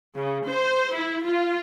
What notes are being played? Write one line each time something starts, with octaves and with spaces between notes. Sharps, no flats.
C#3
C5
E4
F4